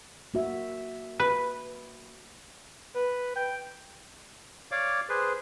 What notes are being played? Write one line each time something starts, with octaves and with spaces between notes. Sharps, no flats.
A#3 F#4 E5
B4
B4
G5
C#5 D5 F5 D6
G#4 B4 C5